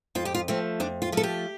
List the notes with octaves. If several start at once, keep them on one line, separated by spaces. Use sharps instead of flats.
F2 F4
G4
F4
F3 A3 C4
F2 D4
F4
F3 A3 A4
G4